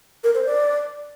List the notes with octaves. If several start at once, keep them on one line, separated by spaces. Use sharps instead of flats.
A#4
C5
D5